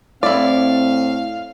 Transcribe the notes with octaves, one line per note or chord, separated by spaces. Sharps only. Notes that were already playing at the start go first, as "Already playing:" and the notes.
A2 C4 E4 D5 F5